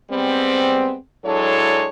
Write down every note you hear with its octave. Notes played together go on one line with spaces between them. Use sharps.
G3 G#3 B3 C4
F#3 G#3 D4 E4 A4 C#5